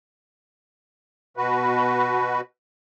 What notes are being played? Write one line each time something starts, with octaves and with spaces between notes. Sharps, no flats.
B2 F#4 B4